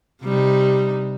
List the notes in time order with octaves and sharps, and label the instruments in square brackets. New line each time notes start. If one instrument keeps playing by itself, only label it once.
[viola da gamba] C3 G3 D#4